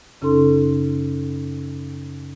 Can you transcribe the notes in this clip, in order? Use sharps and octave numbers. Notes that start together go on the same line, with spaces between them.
F#2 C#3 C#4 D#4 A4 C6